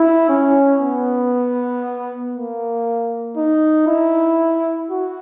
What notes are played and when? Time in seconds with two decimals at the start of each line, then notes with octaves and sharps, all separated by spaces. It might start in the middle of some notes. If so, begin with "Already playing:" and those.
Already playing: E4
0.29 C#4
0.80 B3
2.34 A#3
3.37 D#4
3.88 E4
4.91 F#4